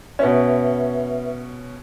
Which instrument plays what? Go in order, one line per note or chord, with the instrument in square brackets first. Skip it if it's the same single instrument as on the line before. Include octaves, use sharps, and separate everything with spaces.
[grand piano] B2 C#4 [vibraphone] B4 E5